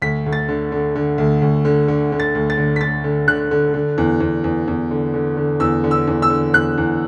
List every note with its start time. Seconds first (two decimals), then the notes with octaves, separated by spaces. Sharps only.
0.02 D2 B6
0.26 D2
0.33 A6
0.49 D3
0.72 D3
0.96 D3
1.18 D2
1.42 D2
1.65 D3
1.88 D3
2.12 D3
2.20 A6
2.35 D2
2.50 A6
2.58 D3
2.76 B6
2.81 D3 A6
3.04 D3
3.28 D3 F#6
3.51 D3
3.74 D3
3.98 E2
4.20 E2
4.44 E2
4.68 E2
4.91 D3
5.14 D3
5.37 D3
5.60 E2 E6
5.84 D3
5.91 E6
6.08 E2
6.22 E6
6.30 D3
6.54 E2 F#6
6.78 E2